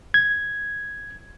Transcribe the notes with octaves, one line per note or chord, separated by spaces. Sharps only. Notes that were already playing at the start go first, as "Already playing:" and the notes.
G#6